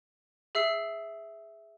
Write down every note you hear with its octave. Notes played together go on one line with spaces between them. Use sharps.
G#4 E5 E6 C7